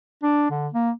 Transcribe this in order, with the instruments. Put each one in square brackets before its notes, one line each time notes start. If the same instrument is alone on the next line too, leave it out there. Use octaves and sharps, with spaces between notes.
[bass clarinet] D4
D3
A#3